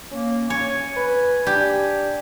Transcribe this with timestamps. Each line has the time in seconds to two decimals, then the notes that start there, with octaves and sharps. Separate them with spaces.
0.11 A#3 C#4
0.50 C#5 G#5
0.96 B4
1.47 D4 G4